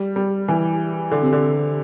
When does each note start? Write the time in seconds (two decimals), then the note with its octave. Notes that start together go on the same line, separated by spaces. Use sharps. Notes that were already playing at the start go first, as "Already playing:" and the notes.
Already playing: G3
0.16 G3
0.48 E3
1.11 D3
1.22 C3
1.33 D3